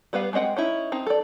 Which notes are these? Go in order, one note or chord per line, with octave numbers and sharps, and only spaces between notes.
G3 B3 B4 F5
G#3 C4 D#5 F#5 G5
C#4 D#4 E4
C4 D#4
A4 D5